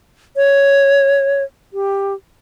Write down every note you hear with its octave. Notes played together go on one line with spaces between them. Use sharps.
C#5
G4